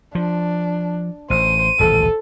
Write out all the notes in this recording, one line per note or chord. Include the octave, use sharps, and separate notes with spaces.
F3 D4
A1 C5 D#7
D#1 A1 D2 A4